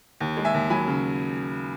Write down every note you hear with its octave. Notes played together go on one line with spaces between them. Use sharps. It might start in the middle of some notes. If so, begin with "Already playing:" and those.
D#2
G#3
E5 G#5
D#2
F#3 G#5 B5
C#3